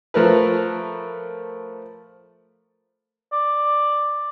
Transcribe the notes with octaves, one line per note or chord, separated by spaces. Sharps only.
F3 A3 A#4 B4
D5